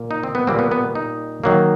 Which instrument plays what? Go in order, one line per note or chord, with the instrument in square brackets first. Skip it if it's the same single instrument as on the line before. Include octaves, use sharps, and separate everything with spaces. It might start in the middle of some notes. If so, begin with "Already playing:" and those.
Already playing: [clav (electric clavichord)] A#2 A#3
D#4
C4
B3
A#2 G3 A#3 C4
B3
B3
D#4
D#3 F#3 A#3